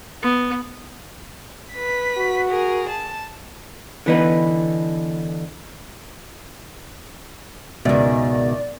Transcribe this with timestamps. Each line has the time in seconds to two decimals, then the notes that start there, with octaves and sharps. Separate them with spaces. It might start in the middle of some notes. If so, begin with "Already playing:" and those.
0.22 B3
1.74 B4 B6
2.17 F#4
2.49 G#4 A#4
2.89 A5
4.06 D3 E3 B3 D#4 B4
7.85 C#2 G#2 B2 D#3 D5 E5